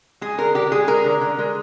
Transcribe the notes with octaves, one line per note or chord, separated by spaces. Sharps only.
G#3 G#4
D3 A#4
D3 G4
G#3 G#4
G#3 A#4
D3
D3
G#3